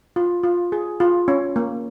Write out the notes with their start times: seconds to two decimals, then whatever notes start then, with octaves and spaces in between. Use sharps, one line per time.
0.16 F4
0.43 F4
0.72 G#4
1.00 F4
1.28 C#4
1.56 A#3